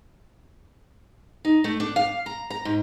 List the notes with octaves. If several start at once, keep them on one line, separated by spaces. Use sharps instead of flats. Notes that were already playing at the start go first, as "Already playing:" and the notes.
D#4
A3
D4
F5
A#5
A#5
G#2